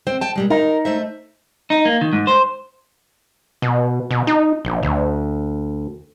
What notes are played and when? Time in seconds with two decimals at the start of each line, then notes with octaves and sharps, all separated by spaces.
0.07 C4 C5 G5
0.21 G5 A5
0.36 A#2 G3 G#3
0.50 D#4 A#4
0.85 A3 C5 E5
1.70 D#4
1.85 A#3
2.01 D#3
2.13 G#2
2.27 C5
3.62 B2
4.11 B2
4.27 D#4
4.65 A#1
4.83 D2